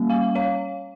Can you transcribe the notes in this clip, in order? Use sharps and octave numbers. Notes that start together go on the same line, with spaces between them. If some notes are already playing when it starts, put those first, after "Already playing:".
Already playing: G3 A#3 C#4
F5 G#5
C#5 F5